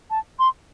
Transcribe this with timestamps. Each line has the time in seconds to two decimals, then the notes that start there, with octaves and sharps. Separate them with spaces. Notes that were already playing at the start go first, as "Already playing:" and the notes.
0.10 A5
0.39 C6